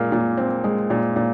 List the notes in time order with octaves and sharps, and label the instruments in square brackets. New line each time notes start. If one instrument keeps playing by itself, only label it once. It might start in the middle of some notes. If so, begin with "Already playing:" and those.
Already playing: [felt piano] A#2 G#3 [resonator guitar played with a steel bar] A#3
[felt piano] A#2
C4
G#3
A#2
A#2